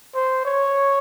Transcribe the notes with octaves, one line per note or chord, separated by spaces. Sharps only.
C5
C#5